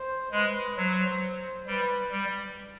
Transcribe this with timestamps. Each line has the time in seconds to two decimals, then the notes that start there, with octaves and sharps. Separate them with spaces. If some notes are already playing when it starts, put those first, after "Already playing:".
Already playing: C5
0.31 G#3 B4
0.77 F#3 C5
1.67 G3 B4
2.12 G3